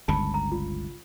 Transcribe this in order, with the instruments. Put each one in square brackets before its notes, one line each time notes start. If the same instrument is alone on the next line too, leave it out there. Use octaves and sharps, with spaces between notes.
[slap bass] G1 C#2 C#3 [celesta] A5 B5
[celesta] A#5
F4